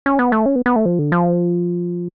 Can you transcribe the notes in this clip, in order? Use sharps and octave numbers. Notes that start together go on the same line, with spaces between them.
C#4
B3
A3
C#4
B3
B3
A3
F3
D3
F3